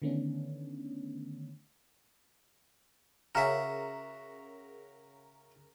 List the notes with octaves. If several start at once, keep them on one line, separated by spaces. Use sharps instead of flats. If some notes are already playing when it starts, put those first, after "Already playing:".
D3 D#3 A3 B3 C#4 D4
C#3 F#4 A#4 E5 A#5